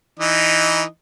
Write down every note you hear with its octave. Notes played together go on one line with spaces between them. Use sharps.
E3 D#4 D#5